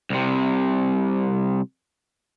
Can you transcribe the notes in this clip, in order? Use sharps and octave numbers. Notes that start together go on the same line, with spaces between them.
C2 C3